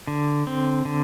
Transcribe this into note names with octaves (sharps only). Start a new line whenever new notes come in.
D3
C4
D3